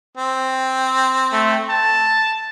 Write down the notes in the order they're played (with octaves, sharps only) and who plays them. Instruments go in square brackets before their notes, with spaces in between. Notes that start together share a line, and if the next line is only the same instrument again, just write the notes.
[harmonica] C4
[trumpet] A3
A5